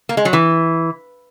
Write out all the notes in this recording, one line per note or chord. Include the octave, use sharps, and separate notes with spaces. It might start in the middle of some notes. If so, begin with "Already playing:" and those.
A#3
G#3
F#3
E3